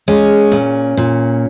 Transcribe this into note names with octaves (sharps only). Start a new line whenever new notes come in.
G#3 C#4
A#2
A#2